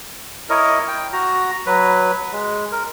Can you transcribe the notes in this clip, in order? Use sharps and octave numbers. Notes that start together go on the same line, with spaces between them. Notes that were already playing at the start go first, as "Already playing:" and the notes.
E4 A#4 C#5 D#5
G5
F#4 A#5
F#3 B4
G#3
A#4